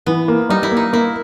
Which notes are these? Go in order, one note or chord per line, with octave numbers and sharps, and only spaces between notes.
E3 B3
A#3
G3 D#4
E4
A#3 D#4
A#3 E4